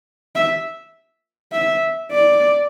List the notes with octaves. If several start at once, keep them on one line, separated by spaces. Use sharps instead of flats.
E5
E5
D5